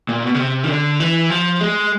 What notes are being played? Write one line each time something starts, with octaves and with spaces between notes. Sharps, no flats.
A#2
B2
C#3
C3
D#3
D3
E3
F3
G#3